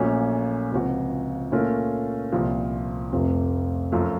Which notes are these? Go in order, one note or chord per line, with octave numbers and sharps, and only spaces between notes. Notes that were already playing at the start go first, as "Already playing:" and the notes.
Already playing: A#1 A#2 F#3 A3 C#4
C#2 C3 F3 C4 F#4
A#2 A3 C#4 F4 A#4
C2 A#2 F3
F1 F2 C3 F3 A3
F#2 F3 A3